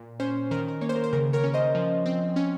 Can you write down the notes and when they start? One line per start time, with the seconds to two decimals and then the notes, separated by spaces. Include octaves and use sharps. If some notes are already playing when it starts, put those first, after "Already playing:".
Already playing: A#2
0.20 C#4 C5
0.51 D#3 A#4
0.68 A#4
0.81 A#3 C#5
0.89 C5
0.96 A#4
1.04 C5
1.13 C#3 A#4
1.33 A#4 C#5
1.43 C#4
1.54 C5 D#5
1.75 F3
2.06 C4
2.36 C#4